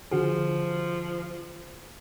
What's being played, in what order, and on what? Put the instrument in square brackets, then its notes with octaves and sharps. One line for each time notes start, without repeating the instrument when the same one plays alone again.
[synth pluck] D3 F#4 G#4 [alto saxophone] F3